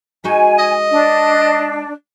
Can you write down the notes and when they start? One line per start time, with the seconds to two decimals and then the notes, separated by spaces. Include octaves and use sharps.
0.24 G#3 D#4 F#4 G#5
0.59 D#5
0.90 D4